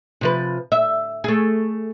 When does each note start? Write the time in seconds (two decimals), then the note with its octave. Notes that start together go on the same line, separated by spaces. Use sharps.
0.21 C3 F3 B4
0.72 E5
1.24 A3 G#4